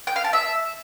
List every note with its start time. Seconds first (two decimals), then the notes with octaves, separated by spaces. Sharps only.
0.07 G5
0.16 F5
0.24 A5
0.33 E5